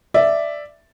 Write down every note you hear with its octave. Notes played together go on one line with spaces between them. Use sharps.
D5 E5